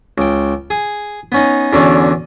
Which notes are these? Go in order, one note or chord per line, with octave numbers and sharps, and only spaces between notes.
C#2 G5
G#4
B3 C#4 D#4
E2 B2 D3 C#4